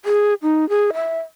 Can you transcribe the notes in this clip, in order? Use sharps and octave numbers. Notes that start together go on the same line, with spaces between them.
G#4
D#4
G#4
E5